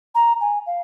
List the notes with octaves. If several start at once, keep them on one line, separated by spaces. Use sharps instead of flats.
A#5
G#5
F5